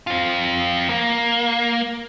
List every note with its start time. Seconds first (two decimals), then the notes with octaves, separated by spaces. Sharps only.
0.07 C4 F4
0.89 A#3